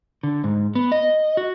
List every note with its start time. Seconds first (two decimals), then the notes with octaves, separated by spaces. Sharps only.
0.23 D3
0.44 G#2
0.75 B3
0.92 D#5
1.37 F#4